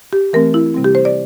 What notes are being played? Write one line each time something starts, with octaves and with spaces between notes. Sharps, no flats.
G4
E3 A3 C4 A#4
E4
C3 G3 C4
G4
C5
D5